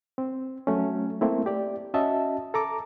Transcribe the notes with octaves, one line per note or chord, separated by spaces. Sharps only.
C4
F#3 A3 C#4
A3 A#3 C4 E4
G4 D5
C#4 F#4 D#5 E5 A5
A4 A#5 D6